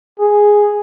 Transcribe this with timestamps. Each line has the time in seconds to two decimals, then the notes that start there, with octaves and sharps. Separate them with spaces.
0.19 G#4